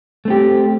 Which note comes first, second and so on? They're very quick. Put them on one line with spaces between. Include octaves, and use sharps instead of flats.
A3 C4 G4